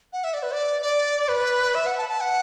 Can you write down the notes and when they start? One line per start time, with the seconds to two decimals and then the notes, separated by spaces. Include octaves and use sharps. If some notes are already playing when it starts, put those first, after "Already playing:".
0.13 F#5
0.24 E5
0.34 D5
0.43 B4
0.52 D5
0.82 D5
1.28 B4
1.75 E5
1.86 F#5
1.98 A5
2.09 A5
2.21 F#5